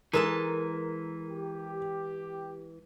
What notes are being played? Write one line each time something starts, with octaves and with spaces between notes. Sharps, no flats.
E3 G#3 A4 A#4 A5
G4